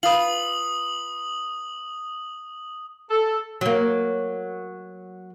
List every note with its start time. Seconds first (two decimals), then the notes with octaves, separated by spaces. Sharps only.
0.03 F4 B4 D#6 F#7
3.11 A4
3.61 F#3 A#3